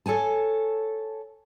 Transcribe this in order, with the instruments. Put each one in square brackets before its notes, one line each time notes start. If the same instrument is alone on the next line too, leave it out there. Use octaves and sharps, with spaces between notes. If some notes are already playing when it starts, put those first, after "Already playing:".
[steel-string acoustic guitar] A4 C#5 G#5 A5